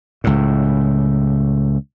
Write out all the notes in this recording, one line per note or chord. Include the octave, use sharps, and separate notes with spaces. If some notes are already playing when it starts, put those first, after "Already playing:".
C#2 A2